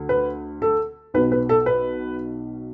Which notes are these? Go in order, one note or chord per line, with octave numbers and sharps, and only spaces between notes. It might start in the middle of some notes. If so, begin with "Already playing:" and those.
Already playing: D2
B4
A4
B1 B2 B4
B4
A4
B4